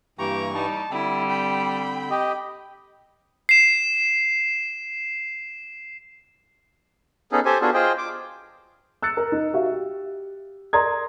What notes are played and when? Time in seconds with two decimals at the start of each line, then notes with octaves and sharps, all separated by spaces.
0.19 G2 E3 A#3 G4 A#5 C#6
0.55 G3 D#4 A5
0.91 D3 G3 C4 E4
1.30 G5 B5
2.10 G4 D#5
3.49 C7 E7
7.32 B3 C#4 D#4 G#4 A4
7.45 G4 A4 C5 G#5
7.61 B3 D4 F4 F#4 G#4 A4
7.74 F4 G#4 C5 D#5 G5
7.98 D6
9.03 E6 F#6 A6 C#7
9.17 A#4
9.32 D#4
9.54 F#4 G4 E5 F5
9.72 G4
10.73 A#4 D5 A#5 C6 D#6 G#6